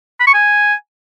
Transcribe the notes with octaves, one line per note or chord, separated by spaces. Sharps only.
B5
C#6
G#5